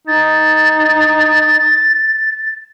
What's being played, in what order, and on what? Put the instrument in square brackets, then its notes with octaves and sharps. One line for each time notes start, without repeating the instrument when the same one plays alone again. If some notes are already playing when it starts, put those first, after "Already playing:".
[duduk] D#4 [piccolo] A6